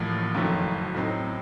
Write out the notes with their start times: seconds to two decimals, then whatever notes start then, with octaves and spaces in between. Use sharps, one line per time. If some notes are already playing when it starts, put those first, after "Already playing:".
Already playing: A1 A2 F3 A#3
0.35 F#1 F2 D#3 F#3 A3
0.95 A2 F#3 C4 D#4